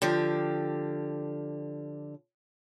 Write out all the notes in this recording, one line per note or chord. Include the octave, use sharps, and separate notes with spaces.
D3 F3 G4